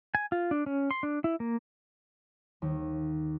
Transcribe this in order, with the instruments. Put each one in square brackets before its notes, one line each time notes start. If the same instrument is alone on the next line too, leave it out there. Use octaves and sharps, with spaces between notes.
[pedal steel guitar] G#5
F4
D4
C#4
C6
D4
E4
A#3
[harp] D#2